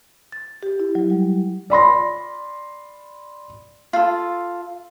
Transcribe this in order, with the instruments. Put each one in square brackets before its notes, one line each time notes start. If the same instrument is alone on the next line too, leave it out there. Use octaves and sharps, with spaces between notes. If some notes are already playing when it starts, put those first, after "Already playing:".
[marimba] A6
G4
E4
F#3
G3
[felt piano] D5 B5 C6 A#6
[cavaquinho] F4 A4